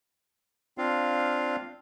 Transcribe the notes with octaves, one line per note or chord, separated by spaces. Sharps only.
C4 D4 F4 F5